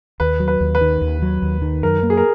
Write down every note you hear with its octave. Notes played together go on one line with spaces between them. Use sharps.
D#2 B4
F#3
B4
D#2
B4
D#3
D#2
F#3
D#2
D#3
F#2 A#4
A#3
G#4
A#4